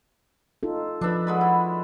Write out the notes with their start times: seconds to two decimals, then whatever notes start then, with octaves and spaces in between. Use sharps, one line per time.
0.63 D#4 F4 A4
1.01 F3 D4 B4 E5
1.27 F#3 G#3 B5
1.41 E4